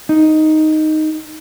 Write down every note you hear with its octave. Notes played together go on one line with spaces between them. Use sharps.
D#4